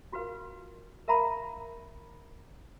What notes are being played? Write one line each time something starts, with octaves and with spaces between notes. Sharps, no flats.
F4 F#4 A#4 B4 F5
A#4 E5 F5 A#5 B5